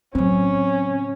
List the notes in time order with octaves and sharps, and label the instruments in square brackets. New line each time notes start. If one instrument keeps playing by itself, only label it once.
[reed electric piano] A2 C4 [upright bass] C#3 F#3 [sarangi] C#4